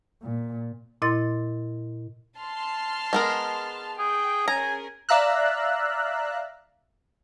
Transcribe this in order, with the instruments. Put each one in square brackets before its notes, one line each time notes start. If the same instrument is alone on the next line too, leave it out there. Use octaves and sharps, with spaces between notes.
[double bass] A#2
[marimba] A#2 E4 D#5 C6 A6
[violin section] A5 C6 F6
[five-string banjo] G#3 B3 A#4
[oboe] G#4 [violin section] G5
[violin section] C#4 G#4 A#4 [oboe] G#5 [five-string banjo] A#5
[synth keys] D5 E5 F5 A#5 E6 F#6